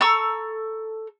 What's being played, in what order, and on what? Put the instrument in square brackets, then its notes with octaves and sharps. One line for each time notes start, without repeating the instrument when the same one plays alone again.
[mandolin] A4 A#5 C#6 E6